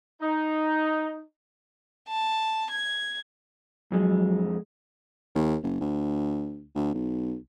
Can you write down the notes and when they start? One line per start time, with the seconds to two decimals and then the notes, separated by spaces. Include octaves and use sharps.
0.22 D#4
2.09 A5
2.71 G#6
3.92 F2 F#3 G#3
5.35 D#2
5.63 F#1
5.81 D2
6.75 D2
6.94 B1